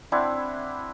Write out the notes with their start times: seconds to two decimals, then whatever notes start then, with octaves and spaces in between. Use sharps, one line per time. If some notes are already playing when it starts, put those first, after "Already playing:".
0.12 C4 D4 E4 F#5